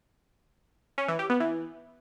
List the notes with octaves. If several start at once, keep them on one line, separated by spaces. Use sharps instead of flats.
C#4
E3
G4
B3
E3